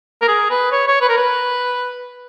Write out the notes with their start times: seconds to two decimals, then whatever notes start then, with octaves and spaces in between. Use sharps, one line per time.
0.22 A#4
0.28 G#4
0.50 B4
0.72 C#5
0.88 C#5
1.01 B4
1.09 A#4
1.17 B4